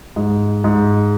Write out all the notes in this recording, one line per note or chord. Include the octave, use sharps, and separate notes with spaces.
G#2
G#2